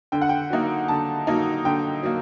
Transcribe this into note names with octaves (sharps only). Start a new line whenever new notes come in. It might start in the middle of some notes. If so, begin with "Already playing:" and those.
D3 G5
F#5
G5
F#3 A#3 D#4
D3 A5
F#3 A#3 D#4
D3 G5
F#3 A#3